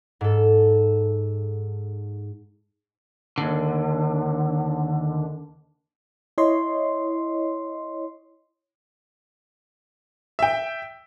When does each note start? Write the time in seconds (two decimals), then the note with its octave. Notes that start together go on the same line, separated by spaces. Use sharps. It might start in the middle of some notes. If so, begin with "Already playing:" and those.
0.21 G#2 A4
3.38 D#2 D3
6.38 E4 C#5 D#5 C6
10.39 E5 G5